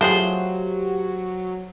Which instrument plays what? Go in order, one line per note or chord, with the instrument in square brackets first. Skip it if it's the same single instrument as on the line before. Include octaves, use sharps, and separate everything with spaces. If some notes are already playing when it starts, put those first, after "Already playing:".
[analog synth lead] F#3 [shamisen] A3 F4 G#4 [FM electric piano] G4 F#5 [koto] C5